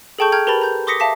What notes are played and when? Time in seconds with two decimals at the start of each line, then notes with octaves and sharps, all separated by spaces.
0.19 G#4 A4 G5 A5 C#6 G6
0.32 G5 A#5 F6 G6 G#6
0.47 G4 A#4 B4 A5 B5 A6
0.62 A#5 G6
0.87 C6 D6 D#6 A#6 B6 C#7
1.00 E5 F5 A5 D6 B6